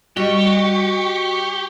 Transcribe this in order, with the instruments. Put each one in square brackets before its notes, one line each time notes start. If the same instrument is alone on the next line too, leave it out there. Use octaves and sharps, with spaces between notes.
[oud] G3 [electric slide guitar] F#4 D#5 [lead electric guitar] G4 [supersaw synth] C#6